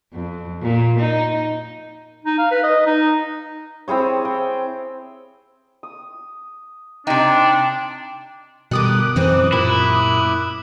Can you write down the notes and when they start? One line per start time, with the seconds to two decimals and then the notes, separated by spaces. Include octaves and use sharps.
0.13 F2
0.62 A#2
0.99 D#4
2.25 D#4
2.38 F5
2.51 B4
2.63 D#5
2.86 D#4
3.88 C4 E4 G#4 C#5
4.25 G5
5.83 D#6
7.07 C3 D4 D#4 G5
8.71 B2 D3 D#3 G3 D6 D#6 F#6
9.16 F#2 E3 C4 D#4
9.52 A#2 E4 G4